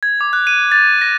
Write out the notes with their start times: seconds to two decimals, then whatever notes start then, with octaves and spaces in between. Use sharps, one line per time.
0.03 G#6
0.21 D6
0.33 F#6
0.47 D#7
0.72 A6
1.01 A#6